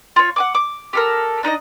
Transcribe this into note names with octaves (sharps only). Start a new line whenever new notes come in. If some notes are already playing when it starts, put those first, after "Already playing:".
F4 C#5
F#5 G#5 D6
D6
G4 A4 A#4
D4 D#4 B4 D#5